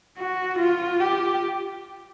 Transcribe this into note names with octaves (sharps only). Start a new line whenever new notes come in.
F#4
F4
G4